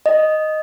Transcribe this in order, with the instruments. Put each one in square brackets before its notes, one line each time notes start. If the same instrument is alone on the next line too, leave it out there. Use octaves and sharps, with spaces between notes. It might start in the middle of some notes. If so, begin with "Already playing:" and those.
[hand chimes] D#5